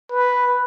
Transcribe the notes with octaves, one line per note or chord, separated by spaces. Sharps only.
B4